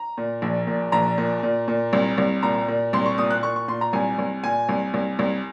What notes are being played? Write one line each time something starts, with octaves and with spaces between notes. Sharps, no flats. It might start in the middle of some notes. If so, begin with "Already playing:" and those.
Already playing: A#5
A#2
A#1
A#2
A#1 A#5
A#2
A#2
A#2
C2
C2
A#2 A#5
A#2
C2 C6
C#6
A#2 D#6
F#6
A#2 C#6
C#6
A#2 C6
A#5
C2 G#5
C2
A#2 G#5
C2
C2
C2